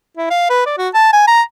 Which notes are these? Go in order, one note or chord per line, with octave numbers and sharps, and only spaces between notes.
E4
F5
B4
D5
F#4
A5
G#5
A#5